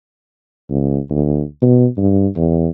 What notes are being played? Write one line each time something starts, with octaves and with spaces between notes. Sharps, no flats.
C#2
D2
B2
G2
E2